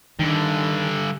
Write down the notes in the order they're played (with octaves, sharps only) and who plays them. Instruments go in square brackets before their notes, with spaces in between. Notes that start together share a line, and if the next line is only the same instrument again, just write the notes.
[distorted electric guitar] G2 D3 [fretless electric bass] D#3